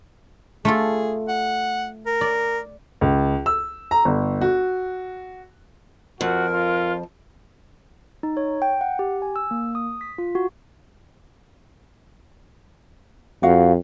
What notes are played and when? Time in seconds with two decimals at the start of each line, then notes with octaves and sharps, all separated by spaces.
0.65 A3 F4 G#4 A4
1.28 F#5
2.07 A#4
2.21 D5
3.01 C#2
3.46 E6
3.91 A#5
4.05 G1
4.41 F#4
6.21 F2 F#4 A#4
6.53 F4
8.23 D#4
8.37 C#5
8.62 G5
8.81 F#5
8.99 G4
9.22 G#5
9.36 E6
9.51 A#3
9.75 D#6
10.01 B6
10.18 F4
10.35 F#4
13.43 F2 F#4 F5